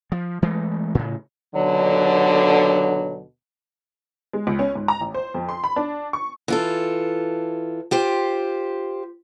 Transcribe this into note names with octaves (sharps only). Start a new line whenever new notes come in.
F3
E3 G#3 A3
A2 C#3
D#2 B2 D3 F#3
G#3
C#2
C#4
G#2
A#5
A1
C5
F2
C6
B5
D4
C#6
E3 F4 A4
F4 G4 C5